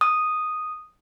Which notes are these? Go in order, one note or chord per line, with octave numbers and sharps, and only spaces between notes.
D#6